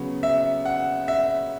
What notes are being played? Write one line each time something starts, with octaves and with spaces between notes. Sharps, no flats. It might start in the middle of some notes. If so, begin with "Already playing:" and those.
Already playing: C#3 F#3 B3
E5
F#5
E5